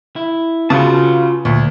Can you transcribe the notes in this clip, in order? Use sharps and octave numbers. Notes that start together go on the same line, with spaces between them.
E4
C#3 F4 F#4 B4 A5
D2 A#2